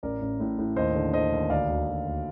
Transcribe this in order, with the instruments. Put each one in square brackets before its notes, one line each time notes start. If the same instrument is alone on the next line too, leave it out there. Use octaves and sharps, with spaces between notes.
[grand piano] A1 A#4 D5
A1
A2
A2
D#2 C5 D#5
D3
D3 C5 D#5
D#2
D2 D5 F5
D2
D2
D2